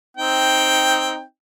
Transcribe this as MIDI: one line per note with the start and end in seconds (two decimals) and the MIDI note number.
0.17 1.22 60
0.17 1.22 63
0.17 1.22 79